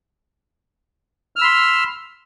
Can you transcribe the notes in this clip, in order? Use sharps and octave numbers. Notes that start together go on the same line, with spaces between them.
B5 C6 E6 F6